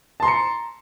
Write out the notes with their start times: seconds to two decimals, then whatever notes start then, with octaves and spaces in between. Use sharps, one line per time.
0.20 A5
0.23 C6
0.25 A#5
0.28 C#7